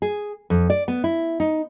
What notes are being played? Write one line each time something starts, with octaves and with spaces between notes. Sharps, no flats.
G#4
F2
D5
B3
E4
D#4